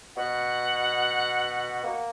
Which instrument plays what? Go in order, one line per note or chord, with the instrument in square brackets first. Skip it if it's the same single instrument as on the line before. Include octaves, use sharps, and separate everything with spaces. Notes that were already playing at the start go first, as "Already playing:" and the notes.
[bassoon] B2 [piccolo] F#5
[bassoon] A#3